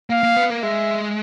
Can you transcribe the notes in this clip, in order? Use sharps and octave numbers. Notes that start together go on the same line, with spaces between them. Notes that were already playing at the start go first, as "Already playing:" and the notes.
A#3 F5
A#3
B3
A#3
G#3 E5